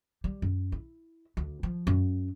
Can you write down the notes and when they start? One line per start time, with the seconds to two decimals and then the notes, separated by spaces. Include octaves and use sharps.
0.24 G3
0.42 F#2
0.72 E4
1.37 D2
1.63 F3
1.87 F#2